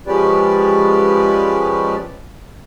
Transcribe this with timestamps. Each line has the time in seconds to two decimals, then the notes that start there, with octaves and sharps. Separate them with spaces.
0.07 F3 G#3 C#4 G4 B4 D5